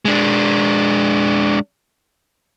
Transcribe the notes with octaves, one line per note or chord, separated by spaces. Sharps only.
G#3 D4